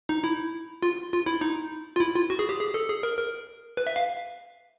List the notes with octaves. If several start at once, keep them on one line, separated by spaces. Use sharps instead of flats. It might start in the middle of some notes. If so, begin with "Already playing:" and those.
D#4
E4
F4
F4
E4
D#4
F4
E4
F4
F#4
G#4
G4
G#4
A4
G#4
A#4
A#4
B4
E5
F5